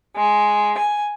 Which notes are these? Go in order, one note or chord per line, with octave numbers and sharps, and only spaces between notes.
G#3
G#5